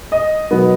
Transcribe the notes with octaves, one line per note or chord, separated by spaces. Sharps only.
D#5
B2 F#3 B3